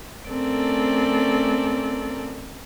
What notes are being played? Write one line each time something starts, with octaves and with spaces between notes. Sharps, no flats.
A3 C4 C#4 A4 A#4 D5